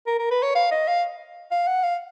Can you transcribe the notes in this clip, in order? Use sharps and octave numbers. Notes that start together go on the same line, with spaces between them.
A#4
A#4
B4
C#5
F5
D#5
F5
F5
F#5
F5